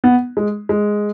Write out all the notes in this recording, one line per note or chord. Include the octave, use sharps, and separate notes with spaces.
B3
G#3
G#3